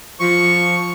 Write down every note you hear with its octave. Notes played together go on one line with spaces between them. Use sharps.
F3 C#6